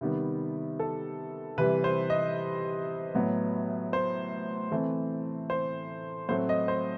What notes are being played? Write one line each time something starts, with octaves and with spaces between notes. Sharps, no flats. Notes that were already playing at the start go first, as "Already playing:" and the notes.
C3 D#3 G3 B3
A4
C3 E3 G3 B4
C5
D#5
A2 F#3 B3
C5
E3 A3 C4
C5
A2 F#3 A3 C4 C5
D#5
C5